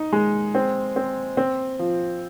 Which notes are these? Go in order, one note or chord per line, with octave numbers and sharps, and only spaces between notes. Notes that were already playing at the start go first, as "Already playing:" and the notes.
Already playing: D#4
G#3
C4
C4
C4
F3